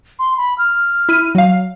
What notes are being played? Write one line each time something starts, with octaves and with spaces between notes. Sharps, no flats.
C6
B5
F6
E4 D#7
F#3 F5